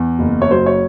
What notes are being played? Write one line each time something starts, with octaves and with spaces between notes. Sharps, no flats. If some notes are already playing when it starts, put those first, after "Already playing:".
Already playing: E2
F#1
C#5
F#3 C5
C#5